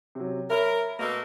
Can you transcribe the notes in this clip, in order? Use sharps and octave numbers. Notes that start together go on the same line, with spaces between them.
C3 F#3
A#4 C#5 E5 B5
B2 A3 A#3